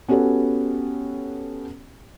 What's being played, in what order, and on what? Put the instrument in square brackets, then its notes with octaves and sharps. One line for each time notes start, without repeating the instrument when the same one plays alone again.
[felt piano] B3 C#4 F#4 G4 A4 C#5